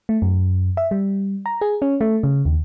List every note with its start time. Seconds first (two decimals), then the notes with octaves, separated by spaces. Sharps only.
0.09 A3
0.22 F#2
0.77 E5
0.91 G3
1.46 A#5
1.61 G#4
1.82 C#4
2.01 A3
2.23 C#3
2.45 D#2